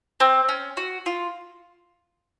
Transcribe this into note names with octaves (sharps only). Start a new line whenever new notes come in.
C4
C#4
F#4
F4